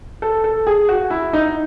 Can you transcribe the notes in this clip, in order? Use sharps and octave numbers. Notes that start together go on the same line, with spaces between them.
A4
A4
G#4
F#4
E4
D#4